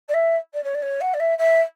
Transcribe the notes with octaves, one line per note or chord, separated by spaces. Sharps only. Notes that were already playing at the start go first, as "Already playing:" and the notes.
D5
E5
D5
C#5
D5
C#5
F#5
D5
E5
E5